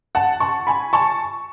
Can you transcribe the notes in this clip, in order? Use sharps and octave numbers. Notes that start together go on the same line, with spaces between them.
F#5 A5
A5 C#6
G#5 B5
A5 C#6